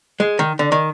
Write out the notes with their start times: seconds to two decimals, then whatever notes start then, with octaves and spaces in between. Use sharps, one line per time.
0.20 G#3
0.39 D#3
0.59 D3
0.72 D#3